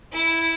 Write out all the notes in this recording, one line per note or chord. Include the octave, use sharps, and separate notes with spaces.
E4